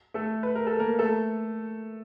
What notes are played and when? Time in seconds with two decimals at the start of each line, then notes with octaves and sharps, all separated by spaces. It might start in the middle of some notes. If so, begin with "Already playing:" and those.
0.14 A3 A4
0.43 B4
0.55 A#4
0.67 A4
0.79 A#3 A#4
0.99 A3 A4